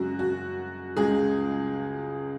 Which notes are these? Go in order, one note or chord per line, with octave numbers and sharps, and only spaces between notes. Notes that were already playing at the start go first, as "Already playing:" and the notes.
Already playing: F#2 C#3 G#3 F#4
F#4
C#2 C#3 G#3 G#4